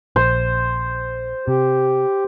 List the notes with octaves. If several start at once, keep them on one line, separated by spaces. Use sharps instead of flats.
A#1 C5
C3 G4